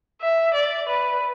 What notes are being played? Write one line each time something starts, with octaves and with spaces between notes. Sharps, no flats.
E5
D5
B4